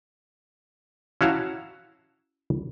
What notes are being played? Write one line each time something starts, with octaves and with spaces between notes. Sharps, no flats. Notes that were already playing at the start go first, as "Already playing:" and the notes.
C#4 E4 F#4 F5 A5 A#5